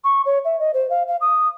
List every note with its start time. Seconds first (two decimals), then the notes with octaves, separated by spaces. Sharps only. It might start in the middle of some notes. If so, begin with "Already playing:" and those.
0.04 C#6
0.26 C#5
0.45 E5
0.59 D#5
0.74 C5
0.90 F5
1.08 F5
1.21 D#6